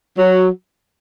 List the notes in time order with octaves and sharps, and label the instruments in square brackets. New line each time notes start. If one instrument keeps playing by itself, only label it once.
[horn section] F#3